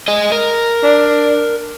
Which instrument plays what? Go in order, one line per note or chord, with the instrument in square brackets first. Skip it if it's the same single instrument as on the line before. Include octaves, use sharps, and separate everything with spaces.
[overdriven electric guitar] G#4 D#5
A#4
[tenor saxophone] D4